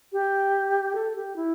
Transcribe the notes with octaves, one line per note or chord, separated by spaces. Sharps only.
G4
A4
G4
E4